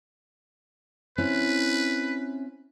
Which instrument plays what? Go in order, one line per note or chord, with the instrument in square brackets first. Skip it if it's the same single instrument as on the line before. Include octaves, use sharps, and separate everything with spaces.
[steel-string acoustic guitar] C4 C#4 E4 [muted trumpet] B4